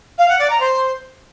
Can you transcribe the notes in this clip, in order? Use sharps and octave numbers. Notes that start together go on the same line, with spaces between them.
F5
F#5
D5
A#5
C5